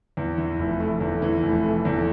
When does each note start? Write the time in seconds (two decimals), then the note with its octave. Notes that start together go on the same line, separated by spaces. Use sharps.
0.17 E2
0.38 E3
0.59 F1
0.80 A3
1.01 E2
1.22 E3
1.43 F1
1.64 A3
1.85 E2